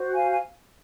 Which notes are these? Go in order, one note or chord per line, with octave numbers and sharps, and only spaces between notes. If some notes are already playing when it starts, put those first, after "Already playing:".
Already playing: F#4 C5
F5 G#5
G#5